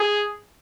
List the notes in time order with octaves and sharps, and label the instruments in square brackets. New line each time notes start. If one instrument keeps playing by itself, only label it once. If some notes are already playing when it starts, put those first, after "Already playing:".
Already playing: [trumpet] G#4